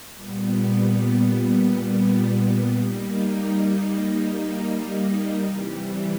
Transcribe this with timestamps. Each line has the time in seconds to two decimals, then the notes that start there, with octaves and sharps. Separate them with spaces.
0.13 A#2 G3 B3
2.78 G3 A#3 D#4
5.44 C3 E3 G3